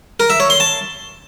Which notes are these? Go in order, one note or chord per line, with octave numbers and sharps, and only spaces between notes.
A#4
E5
C#5
C6
A5